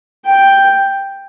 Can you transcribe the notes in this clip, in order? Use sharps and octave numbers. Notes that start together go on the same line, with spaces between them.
G5